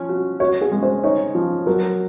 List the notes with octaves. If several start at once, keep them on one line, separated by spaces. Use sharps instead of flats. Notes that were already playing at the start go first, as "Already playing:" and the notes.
Already playing: F3 C#4
F#4
F#4 C#5
G#4
G#3
C5
D#4 C#5
F3
F#3 A#4